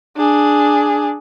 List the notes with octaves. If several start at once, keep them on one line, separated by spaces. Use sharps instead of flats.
D4 G#4